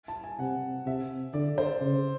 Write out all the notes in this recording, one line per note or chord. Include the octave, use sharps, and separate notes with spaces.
A5
G#5
C3 F#5
C3 E5
D3 D5
C5
C#3